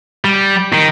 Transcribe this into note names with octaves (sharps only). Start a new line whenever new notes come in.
G3
D#3